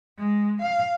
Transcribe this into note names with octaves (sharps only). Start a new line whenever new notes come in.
G#3
F5